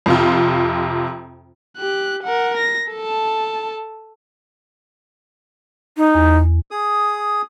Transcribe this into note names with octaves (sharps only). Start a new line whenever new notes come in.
F2 C3 F4
G4 F#6
A#4 F#5
A#6
A4 A5
D#4
E2
G#4 D#6